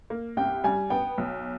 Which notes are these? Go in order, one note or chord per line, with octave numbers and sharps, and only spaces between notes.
A#3
C2 G5
G3 G#5
B3 G5
B1